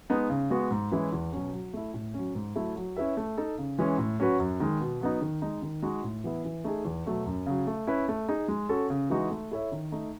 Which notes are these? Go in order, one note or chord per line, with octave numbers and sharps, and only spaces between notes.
G#3 B3 D#4
C#3
G#3 B3 F#4
G#2
E3 G#3 C#4 E4
E2
B2 F#3 C#4
F#3
A3 E4
A2
F#3 C#4
G#2
F#3 A3 E4 A4
F#3
C#4 E4 B4 E5
A3
D#4 A4
C#3
E3 G#3 C#4
A2
F#3 C#4 F#4 B4
F#2
D#3 G#3
B2
F#3 B3 D#4
D#3
G#3 D#4
D#3
G#3 D#4 F#4
A2
E3 B3 E4
E3
A3 D#4 G#4
E2
B2 F#3 A3
F#2
C#3 F#3
A3
C#4 E4 B4
A3
D#4 G#4
G#3
C#4 F#4 A4
C#3
E3 G#3 D#4 F#4
A3
E4 A4 C#5 E5
D#3
A3 D#4